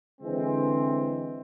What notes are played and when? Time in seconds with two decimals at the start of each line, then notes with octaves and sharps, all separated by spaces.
0.21 D3 E3 G#3 C4